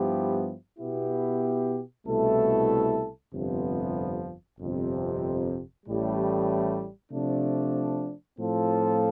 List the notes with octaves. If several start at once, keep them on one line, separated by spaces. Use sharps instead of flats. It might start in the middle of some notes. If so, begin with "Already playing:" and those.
Already playing: G2 F3 B3 E4 G4
B2 B3 E4 G4
C2 B2 A3 E4 A4
G1 F2 C3 F3 B3
G1 F2 C3
A1 A2 G3
C3 F3 A3 D4
A2 F3 C4 F4 A4